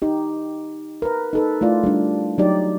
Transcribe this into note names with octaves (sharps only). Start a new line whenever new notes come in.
D#4 G4
A#4 B4
D#4 A4 B4
A3 E4 F4 D5
G3 D4
F#3 D#4 G4 D5